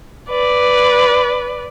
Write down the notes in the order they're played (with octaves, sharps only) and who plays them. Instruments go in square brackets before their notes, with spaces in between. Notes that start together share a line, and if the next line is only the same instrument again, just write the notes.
[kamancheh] B4 D5